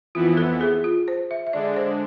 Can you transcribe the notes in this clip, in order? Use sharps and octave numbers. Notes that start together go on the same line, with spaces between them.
F2 E3 B3 E4 F4
A4
G#4
F4
C5
E5
E5
D3 G#3 D4 D5
C5